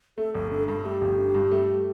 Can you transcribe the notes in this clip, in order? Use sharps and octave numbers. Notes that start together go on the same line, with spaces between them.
A3 A4
G1 A4
D3 A4
G2 A4
A3 G4
G1
D3
G2
A3